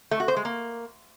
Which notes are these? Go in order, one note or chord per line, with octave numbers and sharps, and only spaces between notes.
A3
F#4
C5
G#3
A#3